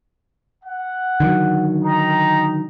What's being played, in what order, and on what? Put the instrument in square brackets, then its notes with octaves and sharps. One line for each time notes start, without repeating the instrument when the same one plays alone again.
[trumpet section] F#5
[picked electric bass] D3 D#3 F#3
[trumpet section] D#4 G5 A#5